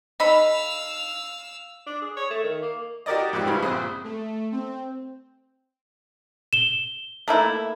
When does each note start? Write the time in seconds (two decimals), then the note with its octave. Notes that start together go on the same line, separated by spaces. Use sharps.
0.20 D#4 A4 D#5 F5 B5 E6
1.87 D4
2.02 G#4
2.17 C#5
2.30 A3
2.43 D#3
2.62 A#3
3.06 F#4 G4 A#4 D5 D#5
3.33 F2 G#2 F#4 G4
3.46 G2 C#3 E3
3.63 A#1 C4 D#6
4.04 A3
4.52 C4
6.53 E7 G7
7.28 A3 A#3 E4